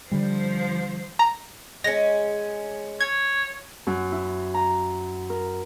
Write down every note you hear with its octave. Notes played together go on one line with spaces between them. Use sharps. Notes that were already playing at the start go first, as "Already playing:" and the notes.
D3 F3 G3 C5
A#5
G#3 C#4 A#6
C#5 G#6
F#2
E4
A#5
A#4